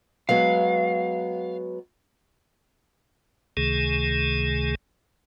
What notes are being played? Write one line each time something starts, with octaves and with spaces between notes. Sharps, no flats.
F#3 G#3 B3 F5
C#2 C3 D#3 A3 G#4